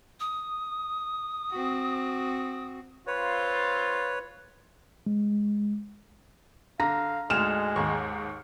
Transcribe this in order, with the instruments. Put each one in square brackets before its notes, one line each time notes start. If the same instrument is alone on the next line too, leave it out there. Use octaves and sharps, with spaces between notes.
[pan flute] D#6
[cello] C4 F#4
[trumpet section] C4 F4 [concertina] B4 C#5
[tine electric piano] G#3
[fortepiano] D3 [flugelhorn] F5 [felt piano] A#5 [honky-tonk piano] A#6
[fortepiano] D2 G#2 [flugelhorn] G#3 [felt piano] F6 [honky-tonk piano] E7 F7
[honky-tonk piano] D#2 G#2 [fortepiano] C#6